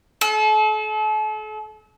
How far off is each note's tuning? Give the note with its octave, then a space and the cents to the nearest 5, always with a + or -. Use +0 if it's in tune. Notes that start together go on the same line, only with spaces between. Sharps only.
A4 -40